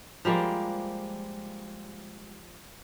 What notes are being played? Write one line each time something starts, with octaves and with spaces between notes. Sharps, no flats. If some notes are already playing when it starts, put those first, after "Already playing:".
F3 G3 G#3 A#3